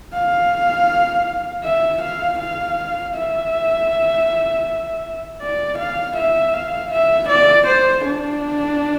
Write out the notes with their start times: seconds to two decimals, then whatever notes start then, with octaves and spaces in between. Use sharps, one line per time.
0.14 F5
1.64 E5
2.02 F5
2.39 F5
3.15 E5
5.41 D5
5.78 F5
6.17 E5
6.53 F5
6.91 E5
7.29 D5
7.67 C5
8.05 D4